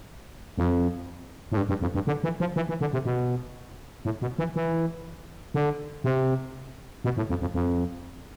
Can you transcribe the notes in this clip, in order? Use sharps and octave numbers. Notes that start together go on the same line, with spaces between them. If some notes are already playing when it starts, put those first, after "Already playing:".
F2
A2
G2
G2
F2
G2
D3
E3
F3
E3
E3
D3
C3
B2
A2
B2
E3
E3
D3
C3
B2
A2
F2
F2
F2